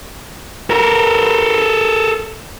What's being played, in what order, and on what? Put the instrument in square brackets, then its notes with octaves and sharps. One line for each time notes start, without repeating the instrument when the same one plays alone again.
[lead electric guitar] A4 A#4